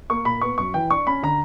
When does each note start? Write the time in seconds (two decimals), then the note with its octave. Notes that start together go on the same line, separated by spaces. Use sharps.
0.10 A#3 C#6
0.25 A#2 B5
0.41 B3 C#6
0.58 F#2 C#6
0.74 E3 G5
0.90 D4 C#6
1.07 C#4 B5
1.23 D3 A#5